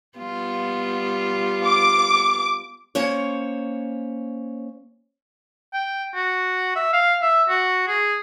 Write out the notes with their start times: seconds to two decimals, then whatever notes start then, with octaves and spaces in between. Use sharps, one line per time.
0.18 G3 B3 F4
1.64 D6
2.95 A#3 C#4 C5 C#5
5.74 G5
6.15 F#4
6.76 E5
6.93 F5
7.22 E5
7.49 F#4
7.88 G#4